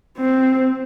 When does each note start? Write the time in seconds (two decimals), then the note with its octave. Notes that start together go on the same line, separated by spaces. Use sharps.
0.18 C4